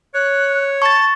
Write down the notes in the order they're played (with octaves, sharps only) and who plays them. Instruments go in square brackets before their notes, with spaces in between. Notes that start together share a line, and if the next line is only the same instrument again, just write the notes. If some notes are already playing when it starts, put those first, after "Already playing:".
[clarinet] C#5 [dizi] F#6
[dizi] A5 [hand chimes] C#6 A6